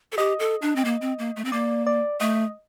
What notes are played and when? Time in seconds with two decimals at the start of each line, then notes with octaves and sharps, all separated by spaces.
0.12 A4
0.17 G4 D#5
0.39 A4
0.62 D4
0.76 C4
0.85 A#3
1.01 C4
1.19 A#3
1.36 A3
1.45 C4
1.52 A#3 D5
1.87 D5
2.20 A3 D#5